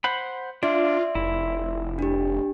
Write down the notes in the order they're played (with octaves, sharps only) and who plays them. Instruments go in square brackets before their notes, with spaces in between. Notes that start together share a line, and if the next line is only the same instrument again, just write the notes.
[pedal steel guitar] C5 F#5 B5
[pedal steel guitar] D4 [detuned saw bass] F4 [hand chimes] D5 E5 C6
[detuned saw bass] F1 [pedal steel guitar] E4
[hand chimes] D4 G4